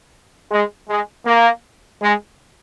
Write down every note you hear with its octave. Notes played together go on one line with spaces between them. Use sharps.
G#3
G#3
A#3
G#3